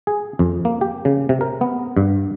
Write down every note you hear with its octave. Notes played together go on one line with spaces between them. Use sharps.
G#4
F2
A#3
G4
C#3
C3
A#4
B3
G2